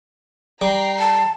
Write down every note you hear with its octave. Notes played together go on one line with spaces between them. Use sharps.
G3 G5 A#5 C7
A5